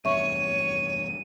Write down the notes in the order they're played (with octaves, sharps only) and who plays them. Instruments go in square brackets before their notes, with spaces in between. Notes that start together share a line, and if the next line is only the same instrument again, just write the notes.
[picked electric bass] F1 E2 G2 [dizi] C#5 [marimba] E5 C#6 [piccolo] D#7